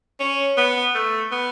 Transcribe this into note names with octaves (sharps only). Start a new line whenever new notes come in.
C#4
B3
A3
B3